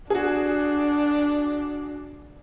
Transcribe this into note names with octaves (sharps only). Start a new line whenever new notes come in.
D4 F#4 G#4